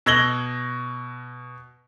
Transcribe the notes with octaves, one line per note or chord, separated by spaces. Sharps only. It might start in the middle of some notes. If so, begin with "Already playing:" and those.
B2 E6 G#6 A#6 F#7 G7